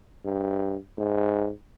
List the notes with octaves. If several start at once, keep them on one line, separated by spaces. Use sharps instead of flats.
G2
G#2